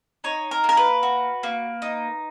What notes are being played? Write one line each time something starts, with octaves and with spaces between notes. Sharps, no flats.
D#4 C#5
A#4
A#3
A#4
B4
F#4
A#3
D#4